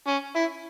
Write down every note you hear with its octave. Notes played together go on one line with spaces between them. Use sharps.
C#4
E4